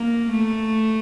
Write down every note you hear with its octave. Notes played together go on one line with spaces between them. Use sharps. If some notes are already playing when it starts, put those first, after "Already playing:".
Already playing: A#3
A3